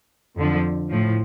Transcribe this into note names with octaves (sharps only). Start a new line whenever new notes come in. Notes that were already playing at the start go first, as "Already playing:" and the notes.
F2 D3 F3
A2 F3